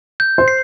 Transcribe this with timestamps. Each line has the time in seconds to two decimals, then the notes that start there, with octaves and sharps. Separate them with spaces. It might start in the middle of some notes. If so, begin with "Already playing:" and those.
0.20 G6
0.38 C5
0.48 C7